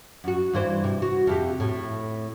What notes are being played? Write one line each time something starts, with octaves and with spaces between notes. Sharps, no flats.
F#2 F#4
G2 E3 C5
C3
F#4
F2 C3 G4
A2